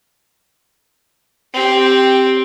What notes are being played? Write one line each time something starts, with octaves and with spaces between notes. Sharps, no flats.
C4 G4